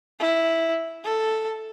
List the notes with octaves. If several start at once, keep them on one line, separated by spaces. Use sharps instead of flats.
E4
A4